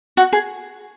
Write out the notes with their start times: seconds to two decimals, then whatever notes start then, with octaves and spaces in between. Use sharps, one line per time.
0.17 F#4
0.33 G#4